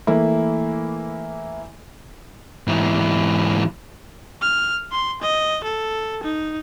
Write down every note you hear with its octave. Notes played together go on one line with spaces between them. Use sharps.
E3 A3 A#3 E4
G#2 E3
F6
C6
D#5
A4
D#4